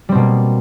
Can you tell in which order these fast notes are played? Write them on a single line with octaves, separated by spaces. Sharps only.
G3 C4 B2 A#3